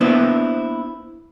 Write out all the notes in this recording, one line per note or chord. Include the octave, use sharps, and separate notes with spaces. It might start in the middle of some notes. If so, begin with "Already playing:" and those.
A#3 B3 D4 E4 B4 C5